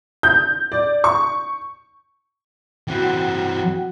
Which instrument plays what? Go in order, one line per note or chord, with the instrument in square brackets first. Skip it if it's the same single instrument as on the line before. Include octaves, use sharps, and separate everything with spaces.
[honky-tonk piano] G6
D5
C#6
[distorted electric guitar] E3 C4 [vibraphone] F#4 F#5 G5